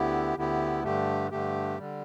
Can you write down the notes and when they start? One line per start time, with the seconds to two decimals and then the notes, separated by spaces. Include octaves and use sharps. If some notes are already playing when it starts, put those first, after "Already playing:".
Already playing: D2 D3 B3 E4 G4
0.37 D2 D3 B3 E4 G4
0.83 G2 D3 A3 G4
1.31 G2 D3 A3 G4
1.78 D3 G3